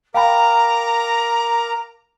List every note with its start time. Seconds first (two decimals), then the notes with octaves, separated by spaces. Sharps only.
0.14 A#4 F5 G5 A#5 B5 D6